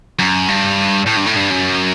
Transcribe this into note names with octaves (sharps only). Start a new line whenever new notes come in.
F#2
G2
A2
G2
A2
G2
F#2